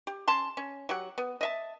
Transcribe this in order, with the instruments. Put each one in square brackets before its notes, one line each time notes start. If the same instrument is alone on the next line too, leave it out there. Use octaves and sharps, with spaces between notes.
[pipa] G4
C#4 A5 C6
C#4
F#3 G4 F#5
B3
D#5 E5 A5